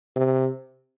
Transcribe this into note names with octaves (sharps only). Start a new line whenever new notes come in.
C3